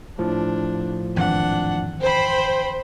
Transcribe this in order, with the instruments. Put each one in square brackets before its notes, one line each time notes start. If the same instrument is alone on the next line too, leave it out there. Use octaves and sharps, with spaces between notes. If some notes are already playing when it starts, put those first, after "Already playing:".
[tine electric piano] A2 F3 [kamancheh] D4
[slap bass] G#1 F2 E3 [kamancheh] D4 F#5
[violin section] C5 [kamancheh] G5 B5